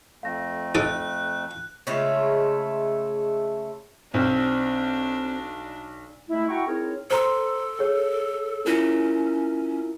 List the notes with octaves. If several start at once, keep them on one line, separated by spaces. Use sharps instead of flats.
F2 A3 F5 A#6
D#4 A4 D6 F#6
C#3 G#3 A3 F4
B1 C4 D4
G#3 A3 E4
E4 F#4 F#5 G5 A#5 C#6
C4 D#4 E4 G#4 A#4 C#5
A4 C5 A#5 C6
G#4 C#5
C#4 E4 F4 A#4